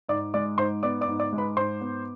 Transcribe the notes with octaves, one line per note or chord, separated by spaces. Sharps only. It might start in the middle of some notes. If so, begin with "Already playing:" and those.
G#2 D5 D6
G#3 D5 D6
G#2 C5 C6
B3 D5 D6
D5 D6
G#2
D5 D6
G#3
B4 B5
G#2 C5 C6
B3